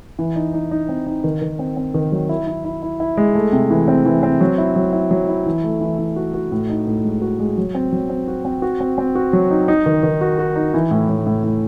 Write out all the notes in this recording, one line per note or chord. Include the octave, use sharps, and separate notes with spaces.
E3
D#4
D#4
D#4
C4
D#4
D#3
D#3
C4
C4
D#3
F#3
E4
E4
E4
E4
E4
G#3
A3
C3
E3
C4
E3
C4
F#3
E4
F#3
E4
F#3
E4
E3
A3
E3
E3
F#4
F#4
A2
D#4
A2
G#3
F#4
G#3
F#3
C4
F#3
C4
F#4
C4
F#4
C4
C4
F#4
F#3
D#4
D#4
D#3
D#3
F#4
F#4
D#4
E3
A2
A2
A2
A2